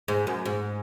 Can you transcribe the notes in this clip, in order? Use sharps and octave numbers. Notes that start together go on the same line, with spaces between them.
G#2
F#2
G#2